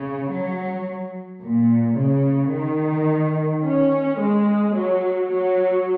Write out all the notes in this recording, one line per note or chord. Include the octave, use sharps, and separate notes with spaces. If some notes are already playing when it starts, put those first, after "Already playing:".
Already playing: C#3
F#3
A#2
C#3
D#3
C#4
G#3
F#3
F#3